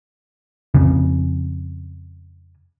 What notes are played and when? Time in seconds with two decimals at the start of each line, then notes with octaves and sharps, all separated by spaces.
0.74 F2 C#3